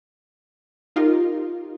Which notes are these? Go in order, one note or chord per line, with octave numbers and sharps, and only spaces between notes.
D#4 F4 G4 A#4